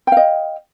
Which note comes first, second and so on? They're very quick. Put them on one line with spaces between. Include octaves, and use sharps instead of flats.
G5 F5 D#5